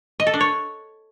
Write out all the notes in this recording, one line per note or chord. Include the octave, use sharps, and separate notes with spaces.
D#5
A4
D4
C#5